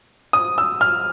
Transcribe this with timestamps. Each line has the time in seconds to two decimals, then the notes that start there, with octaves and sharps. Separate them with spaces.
0.33 D#6
0.58 E6
0.81 F6